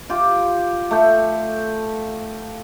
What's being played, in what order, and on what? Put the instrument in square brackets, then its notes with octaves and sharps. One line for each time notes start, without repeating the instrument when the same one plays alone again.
[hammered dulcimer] F4 G4
A3 A4 G5